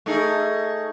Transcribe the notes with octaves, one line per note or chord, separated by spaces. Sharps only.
A3 D#4 G#4